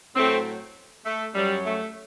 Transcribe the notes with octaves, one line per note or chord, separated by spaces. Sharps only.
A2 F#3 A3 C4
A3
F#2 F#3 G3
A3